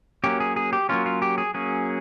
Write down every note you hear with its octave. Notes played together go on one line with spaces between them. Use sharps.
F#3 A#3 C#4 G4
G#4
G#4
G4
F#3 A#3 C#4 F4
F4
G4
G#4
F#3 A#3 C#4 G#4